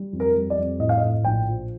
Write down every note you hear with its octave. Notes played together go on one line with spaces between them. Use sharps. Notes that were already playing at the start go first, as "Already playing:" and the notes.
Already playing: G3
F2
A#4
G3
D5
F2
A2 D#5
F5
D#5
A2
A#1 G5
F3